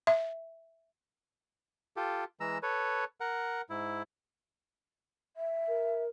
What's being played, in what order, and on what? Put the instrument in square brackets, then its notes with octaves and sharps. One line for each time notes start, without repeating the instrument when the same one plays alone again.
[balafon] E5
[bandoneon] F4 G4 A4
E3 G#3 A#5 E6
A4 B4 C#5
A#4 F#5
G#2 E4
[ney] E5
[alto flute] A#4